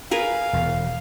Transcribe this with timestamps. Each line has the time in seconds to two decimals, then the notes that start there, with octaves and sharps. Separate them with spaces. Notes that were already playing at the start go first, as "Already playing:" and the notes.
0.11 G#4 A#4 B4 F5
0.53 E1 E2